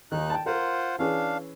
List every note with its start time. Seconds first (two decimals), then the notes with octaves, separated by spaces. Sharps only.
0.12 D#2 D#3 D#4 F#6
0.30 G5 A5
0.46 F4 A#4 C5 F#5
0.99 E3 C#4 D4 G#4 F5